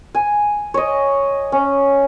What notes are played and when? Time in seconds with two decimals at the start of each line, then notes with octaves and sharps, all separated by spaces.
0.15 G#5
0.74 C#5 D#5
1.52 C#4